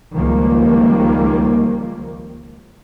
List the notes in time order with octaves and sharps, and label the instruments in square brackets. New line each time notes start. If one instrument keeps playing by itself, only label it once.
[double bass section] C#2 D#3 F3 G3 A#3